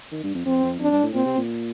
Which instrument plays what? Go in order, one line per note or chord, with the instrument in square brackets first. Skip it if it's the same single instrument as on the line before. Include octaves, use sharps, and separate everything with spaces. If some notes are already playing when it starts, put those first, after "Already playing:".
[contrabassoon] D#3
G2
F2
[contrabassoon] F2 [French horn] C4
[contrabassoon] F2
[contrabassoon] F2 [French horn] D4
[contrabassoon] G2
A2
[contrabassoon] A#2 [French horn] C4
[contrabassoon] C3
A#2